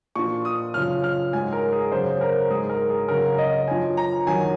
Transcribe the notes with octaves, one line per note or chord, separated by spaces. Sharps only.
A#2 F3 C#6
D#6
F#2 C#3 F3 F6
F6
G#2 F#3 G#5
A#4
G#4
F#2 C#3 F#3 C5
A#4
G#2 F#3 G#4
A#4
G#4
F#2 C#3 F#3 A#4
D#5
F#2 F3 G#5
A#5
F#2 D#3 F#3 G#5